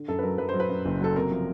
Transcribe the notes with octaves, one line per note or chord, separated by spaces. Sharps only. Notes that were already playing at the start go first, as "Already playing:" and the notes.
Already playing: D3
F#2 A4
B4
F#3 A#4
F#2 B4
C5
F#3
B4
F#2
F#1
F#3 A4
C3 A#4
F3